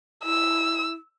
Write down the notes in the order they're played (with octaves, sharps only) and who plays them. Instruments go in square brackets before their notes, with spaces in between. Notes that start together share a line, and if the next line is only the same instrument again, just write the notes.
[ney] E4 [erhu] E6